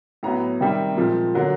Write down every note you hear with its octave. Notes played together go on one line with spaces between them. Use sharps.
A2 F#3 B3 A#5
C3 D#3 G3 C4
A#2 F3 G#3 C4
D3 F#3 A#3